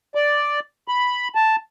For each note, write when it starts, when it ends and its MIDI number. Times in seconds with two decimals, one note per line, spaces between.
0.15 0.60 74
0.88 1.28 83
1.35 1.56 81